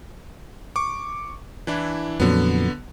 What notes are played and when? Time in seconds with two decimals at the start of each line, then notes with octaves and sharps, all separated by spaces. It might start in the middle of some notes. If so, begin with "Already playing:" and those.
0.76 C#6 D6
1.67 E3 D4 E4
2.20 F2 A#2 D3 F#3 B3